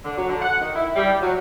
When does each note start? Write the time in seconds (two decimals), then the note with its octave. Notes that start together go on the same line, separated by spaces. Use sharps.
0.04 D3
0.16 F#3
0.29 D3
0.42 F#5
0.61 D#3
0.75 E4
0.95 G3
1.21 F#3